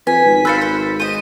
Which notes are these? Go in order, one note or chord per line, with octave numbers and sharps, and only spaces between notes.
F2 B4 G#5 B6
G#1
B4 C5 F5 E6 A6 C#7
C5 B5
C5 D#5 D#7